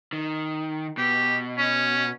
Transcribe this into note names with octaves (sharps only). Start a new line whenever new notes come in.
D#3
B2 G4
C#4